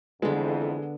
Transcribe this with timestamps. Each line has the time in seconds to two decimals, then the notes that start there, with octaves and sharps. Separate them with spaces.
0.22 F2 D3 E3 G#3 B3